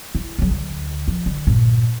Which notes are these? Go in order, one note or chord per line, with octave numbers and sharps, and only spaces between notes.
E4
C#3 F#3
D2
F3
D3
G1 A#2